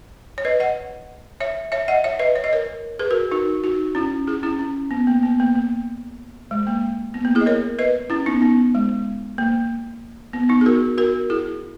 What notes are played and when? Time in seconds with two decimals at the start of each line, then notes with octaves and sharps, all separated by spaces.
0.38 C#5
0.45 B4 D#5
0.60 D#5 F#5
1.40 C#5 E5
1.72 C#5 E5
1.88 D#5 F#5
2.04 C#5 E5
2.19 B4 D#5
2.36 C#5
2.44 D#5
2.53 A#4 C#5
2.99 G#4 B4
3.11 F#4 A#4
3.31 D#4 F#4
3.64 D#4 F#4
3.95 C#4 E4
4.27 E4 G#4
4.43 C#4 E4
4.59 C#4
4.91 B3
5.07 A#3
5.23 B3
5.40 A#3
5.55 A#3
6.51 G#3
6.67 A#3
7.14 B3
7.25 A#3
7.35 E4 G#4
7.41 D#5
7.46 A#4 C#5
7.79 B4 D#5
8.10 C#4 E4
8.26 B3 D#4
8.42 B3
8.75 G#3
9.38 A#3
10.33 B3
10.49 B3 D#4
10.61 G#4
10.66 F#4 A#4
10.98 F#4 A#4
11.30 E4 G#4